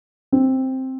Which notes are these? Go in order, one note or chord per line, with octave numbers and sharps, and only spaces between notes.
C4